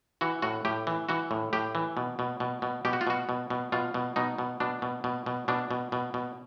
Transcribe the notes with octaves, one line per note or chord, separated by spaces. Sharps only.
E3 F#4
A2 F#4
A2 G4
E3
E3 F#4
A2
A2 G4
E3
B2
B2
B2
B2
B2 G4
F#4
F4
B2 F#4
B2
B2
B2 F4
B2
B2 D#4
B2
B2 D4
B2
B2
B2
B2 D4
B2
B2
B2